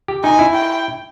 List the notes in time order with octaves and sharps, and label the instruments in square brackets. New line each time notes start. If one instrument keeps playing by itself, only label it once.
[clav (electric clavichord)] G4
[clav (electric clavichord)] D#4 [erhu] G#5
[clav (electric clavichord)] E4
[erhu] G5